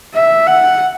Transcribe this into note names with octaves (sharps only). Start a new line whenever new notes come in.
E5
F#5